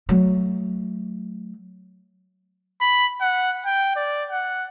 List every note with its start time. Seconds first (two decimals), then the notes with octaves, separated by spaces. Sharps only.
0.09 F#3 A3
2.81 B5
3.21 F#5
3.66 G5
3.96 D5
4.31 F#5